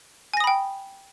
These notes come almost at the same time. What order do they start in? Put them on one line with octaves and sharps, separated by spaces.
G#5 A#6 D#6 B5 G5